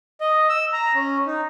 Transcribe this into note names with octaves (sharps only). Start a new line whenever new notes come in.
D#5
E6
A#5
C#4
D#4